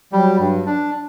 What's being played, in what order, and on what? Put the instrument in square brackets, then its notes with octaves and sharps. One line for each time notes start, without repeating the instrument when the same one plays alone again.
[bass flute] F#3 [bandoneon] G3
[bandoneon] G2
D4